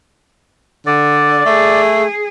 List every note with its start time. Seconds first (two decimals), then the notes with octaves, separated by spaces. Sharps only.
0.86 D3 D5
1.46 A3 G#4